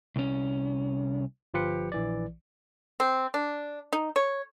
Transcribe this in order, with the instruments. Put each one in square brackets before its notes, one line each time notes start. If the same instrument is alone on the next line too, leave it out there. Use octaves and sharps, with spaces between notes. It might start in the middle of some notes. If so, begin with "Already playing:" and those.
[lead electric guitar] C2 C#4
[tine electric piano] G1 F3 F4 G4 B4 C#7
A#1 E3 D5
[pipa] C4
D4
D#4
C#5